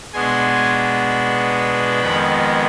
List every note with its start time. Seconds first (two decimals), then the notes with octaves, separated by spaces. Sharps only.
0.13 B2 G#3 B3 D4 G#5 C6
2.00 F2 D#3 G#3 B3 G5 B5